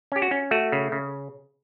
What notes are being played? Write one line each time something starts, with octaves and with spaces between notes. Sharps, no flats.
C#4 G4
F#4
C#4
A3 F#4
C#3
C#3